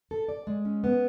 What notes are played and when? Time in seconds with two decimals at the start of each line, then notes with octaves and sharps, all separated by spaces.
0.11 A4
0.29 D5
0.47 G#3
0.65 C#4
0.84 B3